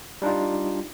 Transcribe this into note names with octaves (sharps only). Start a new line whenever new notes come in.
G3 D4 D#4 F4